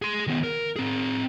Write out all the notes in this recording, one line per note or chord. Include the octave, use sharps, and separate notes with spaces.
G#4 C6
D#3 B3
A#4
C4 G#4